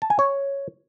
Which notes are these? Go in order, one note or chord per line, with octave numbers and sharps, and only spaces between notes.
A5
G#5
C#5